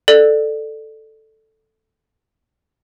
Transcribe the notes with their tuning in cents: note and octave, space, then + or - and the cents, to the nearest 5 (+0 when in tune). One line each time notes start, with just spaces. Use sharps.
A4 +0 D5 +20